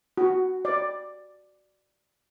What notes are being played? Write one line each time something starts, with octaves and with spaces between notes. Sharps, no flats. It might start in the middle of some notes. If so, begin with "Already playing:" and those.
F#4
D5